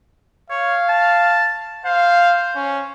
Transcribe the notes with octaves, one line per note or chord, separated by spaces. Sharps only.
C#5 F5
A5
C5 F5
C#4